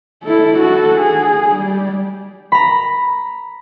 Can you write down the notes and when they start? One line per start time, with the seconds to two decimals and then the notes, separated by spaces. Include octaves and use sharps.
0.23 E4 A4
0.58 F#4 A4
0.99 G#4
1.56 G3
2.52 A#5 B5